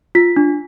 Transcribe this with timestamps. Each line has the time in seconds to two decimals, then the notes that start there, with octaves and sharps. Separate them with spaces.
0.15 F4 B6
0.36 D4